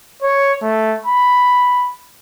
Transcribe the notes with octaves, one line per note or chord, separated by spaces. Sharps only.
C#5
A3
B5